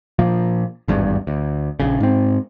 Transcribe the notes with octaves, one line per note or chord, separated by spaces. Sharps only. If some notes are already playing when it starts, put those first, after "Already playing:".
A#2 F3 A#3
G#1 E2 G2
D2
A#1 C#3
G#2 C4